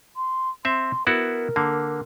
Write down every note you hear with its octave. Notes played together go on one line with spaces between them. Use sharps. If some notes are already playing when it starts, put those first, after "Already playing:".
C6
C4 E5 C6
B3 E4 F#4 A#4
D3 A#3